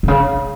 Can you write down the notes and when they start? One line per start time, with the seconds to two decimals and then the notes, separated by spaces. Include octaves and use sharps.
0.03 C3
0.08 C#3